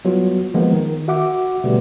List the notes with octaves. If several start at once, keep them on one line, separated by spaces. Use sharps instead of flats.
F#3 G3 B3 F4 F#4
D#3 F3 G#3 A#3 B3
D#3
F#4 E5 F#5 D6
B2 D3 G3 A3 B3 G4